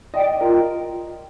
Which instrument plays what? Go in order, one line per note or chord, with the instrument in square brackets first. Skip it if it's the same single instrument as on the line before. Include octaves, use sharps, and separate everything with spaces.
[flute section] D5 G5 [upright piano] D#5
[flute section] F4 [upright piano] A#4